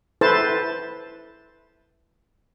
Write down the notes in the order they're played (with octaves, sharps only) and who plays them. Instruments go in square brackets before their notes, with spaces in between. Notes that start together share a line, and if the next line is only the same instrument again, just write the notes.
[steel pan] E4 A4 B4 C5 A5